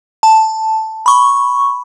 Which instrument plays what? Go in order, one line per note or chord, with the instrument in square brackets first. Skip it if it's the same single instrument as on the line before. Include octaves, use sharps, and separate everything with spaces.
[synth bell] A5
B5 C#6